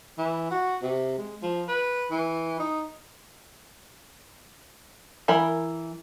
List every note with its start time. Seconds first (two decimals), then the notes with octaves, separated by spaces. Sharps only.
0.18 E3
0.51 F#4
0.82 C3
1.18 G#3
1.42 F3
1.68 B4
2.10 E3
2.60 D#4
5.28 E3 A#4 B5